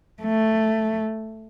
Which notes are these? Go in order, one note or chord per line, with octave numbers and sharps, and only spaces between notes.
A3